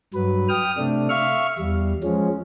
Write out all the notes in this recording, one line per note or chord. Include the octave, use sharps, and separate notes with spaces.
G2 F#3 B4
G5 D#6 F6
C3 A3 D4
E5 F5 C#6 F6
E2 G3
F3 G#3 C#4